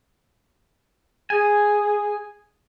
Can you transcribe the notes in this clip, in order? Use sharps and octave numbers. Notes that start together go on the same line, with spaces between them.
G#4 G#5